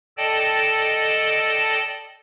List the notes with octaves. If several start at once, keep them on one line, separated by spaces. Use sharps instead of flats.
A4 D5 D#5 G5 A5